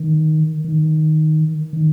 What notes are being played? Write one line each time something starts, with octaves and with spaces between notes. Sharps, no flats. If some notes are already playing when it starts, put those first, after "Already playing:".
Already playing: D#3
D#3
D#3